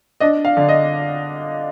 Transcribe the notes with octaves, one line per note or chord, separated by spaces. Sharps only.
D4 D#5
F5
D3
D#5